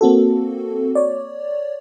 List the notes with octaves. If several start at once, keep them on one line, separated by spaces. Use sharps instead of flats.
A#3 C4 F#4 A4
C#5 D5